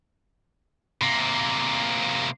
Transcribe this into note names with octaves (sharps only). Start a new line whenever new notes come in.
C3 A#3